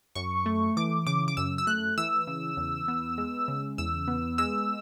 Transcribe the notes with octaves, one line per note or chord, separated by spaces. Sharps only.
F#2 C#6
A3
E3 D6
C#3 D6
D6
F#2 E6
E6
A3 F#6
E3 E6
C#3
E2
B3
G#3
C#3
E2 E6
B3
G#3 E6